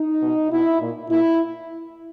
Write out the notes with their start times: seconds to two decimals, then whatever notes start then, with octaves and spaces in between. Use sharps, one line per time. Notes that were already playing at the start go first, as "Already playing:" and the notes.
Already playing: D#4
0.22 B2
0.51 B2 E4
0.80 A#2
1.10 A#2 E4